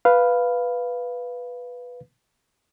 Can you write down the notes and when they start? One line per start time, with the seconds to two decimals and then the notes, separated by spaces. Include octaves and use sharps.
0.05 B4 F5